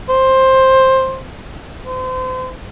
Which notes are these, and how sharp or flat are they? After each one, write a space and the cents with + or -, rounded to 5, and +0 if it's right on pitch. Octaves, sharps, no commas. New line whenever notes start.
C5 +10
C5 -35